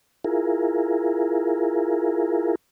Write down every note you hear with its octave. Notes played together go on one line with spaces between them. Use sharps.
E4 F4 G#4 A#4